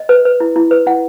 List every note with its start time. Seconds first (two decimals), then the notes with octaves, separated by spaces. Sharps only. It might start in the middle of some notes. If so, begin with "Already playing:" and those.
Already playing: D#5
0.09 B4
0.25 B4
0.40 E4
0.56 E4
0.71 B4
0.86 E4 F#5